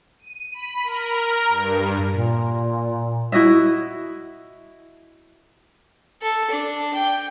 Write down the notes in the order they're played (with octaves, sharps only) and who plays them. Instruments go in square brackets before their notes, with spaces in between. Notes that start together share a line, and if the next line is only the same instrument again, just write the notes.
[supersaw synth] D#7
B5
A#4
G2
[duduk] A#2
[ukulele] E4 F#4 D#5 E5
[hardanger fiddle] A4
D4
G5